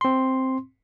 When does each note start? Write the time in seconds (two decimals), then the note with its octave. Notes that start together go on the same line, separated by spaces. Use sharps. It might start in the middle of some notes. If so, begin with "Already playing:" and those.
0.01 C4 C6